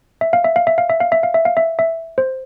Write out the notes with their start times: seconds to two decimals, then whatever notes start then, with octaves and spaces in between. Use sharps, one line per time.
0.21 E5
0.33 F5
0.44 E5
0.56 F5
0.67 E5
0.78 F5
0.90 E5
1.01 F5
1.12 E5
1.23 F5
1.34 E5
1.45 F5
1.57 E5
1.79 E5
2.18 C5